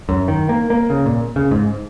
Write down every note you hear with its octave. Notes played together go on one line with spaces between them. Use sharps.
F#2
D#3
A#3
A#3
C#3
A#2
C#3
G#2